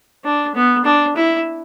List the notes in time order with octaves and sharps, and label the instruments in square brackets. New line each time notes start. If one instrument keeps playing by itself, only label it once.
[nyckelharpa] D4
B3
D4
E4